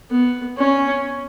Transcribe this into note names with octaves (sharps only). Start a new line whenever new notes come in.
B3
C#4